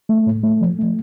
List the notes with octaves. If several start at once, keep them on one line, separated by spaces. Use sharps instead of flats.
A3
A2
A3
F3
A3